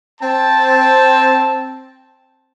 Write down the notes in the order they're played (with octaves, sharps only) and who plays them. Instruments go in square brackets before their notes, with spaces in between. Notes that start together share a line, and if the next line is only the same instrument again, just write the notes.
[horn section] C4 A5